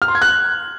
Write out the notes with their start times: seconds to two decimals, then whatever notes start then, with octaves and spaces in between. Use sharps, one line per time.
0.02 F6
0.08 C6
0.15 G#6
0.22 F#6